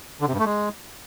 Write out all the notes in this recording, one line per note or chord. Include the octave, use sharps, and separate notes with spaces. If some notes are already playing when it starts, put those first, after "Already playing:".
D3
C3
G2
A3
G#3